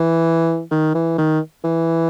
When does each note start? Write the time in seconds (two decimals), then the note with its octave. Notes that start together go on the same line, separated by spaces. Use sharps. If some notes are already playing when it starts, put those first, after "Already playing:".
Already playing: E3
0.71 D#3
0.95 E3
1.18 D#3
1.64 E3